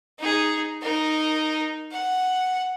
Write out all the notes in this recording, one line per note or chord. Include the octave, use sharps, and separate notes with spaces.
D#4 G#4
D#4 A#4
F#5